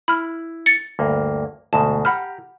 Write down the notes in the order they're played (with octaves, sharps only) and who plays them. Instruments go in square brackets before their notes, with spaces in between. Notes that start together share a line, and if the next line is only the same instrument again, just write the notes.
[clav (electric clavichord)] E4 [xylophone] B5 F6
[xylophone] A6 C#7
[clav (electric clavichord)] D2 G2 A#3
[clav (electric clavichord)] D2 G#2 B2 [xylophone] A5
[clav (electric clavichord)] G4 A#5 [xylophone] F#5 B5 F6